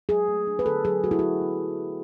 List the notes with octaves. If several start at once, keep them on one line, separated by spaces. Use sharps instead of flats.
F#3 G#4
A3
D4
B4
D3 A4
F#3 G#4
A3 F#4
E4
F#3 F#4
B3